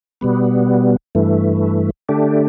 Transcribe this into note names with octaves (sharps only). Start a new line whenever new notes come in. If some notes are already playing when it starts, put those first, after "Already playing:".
B2 G3 B3
G2 E3 A3
D3 A3 D4 G4